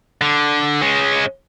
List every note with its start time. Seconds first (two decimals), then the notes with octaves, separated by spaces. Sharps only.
0.21 D3
0.81 G#3 C#4